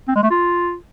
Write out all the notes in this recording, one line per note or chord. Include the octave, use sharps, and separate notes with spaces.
C4
G#3
A3
F4